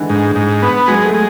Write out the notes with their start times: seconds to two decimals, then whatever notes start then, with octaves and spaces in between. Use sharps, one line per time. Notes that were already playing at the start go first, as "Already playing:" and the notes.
Already playing: D3 E3 G#3
0.10 G#2
0.36 G#2
0.62 B3
0.88 F#3 G#3
1.05 A3
1.14 G#3